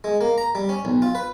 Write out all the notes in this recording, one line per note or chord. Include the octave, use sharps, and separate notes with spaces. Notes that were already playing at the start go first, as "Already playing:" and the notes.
G#3
A#3
A#5
G3
C#4
B1
F4
B4